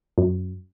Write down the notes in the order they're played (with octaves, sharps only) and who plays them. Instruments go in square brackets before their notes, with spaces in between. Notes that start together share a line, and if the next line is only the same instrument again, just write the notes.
[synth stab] F#2